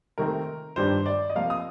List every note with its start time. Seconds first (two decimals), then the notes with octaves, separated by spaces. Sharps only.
0.18 C3 D#3 A3 C4 A#4
0.76 G2 D#3 G3 D4 C5
1.06 D5
1.30 D#5
1.35 C3 F3 A#3 F5
1.50 D#6